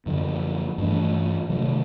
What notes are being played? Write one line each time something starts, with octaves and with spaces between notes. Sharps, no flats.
F#2 D3 F3
G2 E3 A3 D4
C3 D#3 F#3 A3